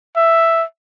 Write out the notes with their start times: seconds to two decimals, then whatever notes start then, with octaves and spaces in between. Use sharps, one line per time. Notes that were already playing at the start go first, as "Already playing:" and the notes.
0.17 E5